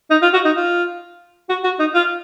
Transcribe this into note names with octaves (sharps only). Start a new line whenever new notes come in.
D#4
F4
F#4
D#4
F4
F#4
F#4
D#4
F4